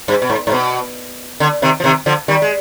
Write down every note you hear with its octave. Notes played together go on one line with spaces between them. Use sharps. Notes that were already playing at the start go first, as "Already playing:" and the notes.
G2
B2
G#2
G#2
B2
D3
C3 D#3
F3
C3 D#3
D3 F3
D#3 G3
G#3